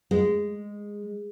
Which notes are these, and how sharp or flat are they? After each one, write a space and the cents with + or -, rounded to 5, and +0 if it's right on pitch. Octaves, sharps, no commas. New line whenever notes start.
G#3 -10